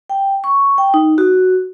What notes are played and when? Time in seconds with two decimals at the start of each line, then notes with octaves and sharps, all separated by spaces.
0.10 G5
0.44 C#6
0.78 G5
0.94 D#4
1.18 F#4